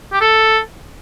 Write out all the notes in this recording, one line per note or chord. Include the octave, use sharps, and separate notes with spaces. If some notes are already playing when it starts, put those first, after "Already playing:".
G4
A4